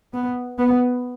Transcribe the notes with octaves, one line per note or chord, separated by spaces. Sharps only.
B3
B3